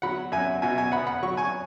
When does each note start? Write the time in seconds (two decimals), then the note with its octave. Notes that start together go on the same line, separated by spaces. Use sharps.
0.02 F#3 F#5 B5
0.32 F#2 E5 G#5
0.62 B2 E5 G#5
0.77 E5 G#5
0.92 B3 F#5 B5
1.07 F#5 B5
1.23 F#3 C#6
1.37 G#5 C#6